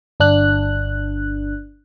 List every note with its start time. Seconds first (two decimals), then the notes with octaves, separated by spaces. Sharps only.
0.20 G1 D4 F#6